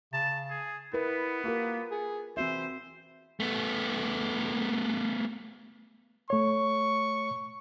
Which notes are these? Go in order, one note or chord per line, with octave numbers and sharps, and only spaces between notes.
C#3 A5
G#4
B3 E4 A#4 B4
A#3 F4 G4 A#4
G#4
E3 C4 F#4 C5 E5
A3 B3
A3 C#5 C#6